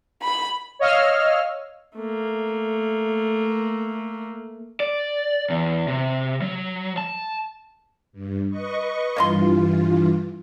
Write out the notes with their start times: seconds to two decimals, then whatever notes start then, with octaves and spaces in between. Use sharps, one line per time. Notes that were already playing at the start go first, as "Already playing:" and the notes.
0.22 B5
0.79 C#5 D#5 F5 E6 F6
1.97 A3 A#3
4.80 D5
5.50 E2
5.88 C3
6.42 F#3
6.98 A5
8.12 G2
8.50 B4 D#5 C#6
9.16 G2 E3 A#3 F4 D5 C6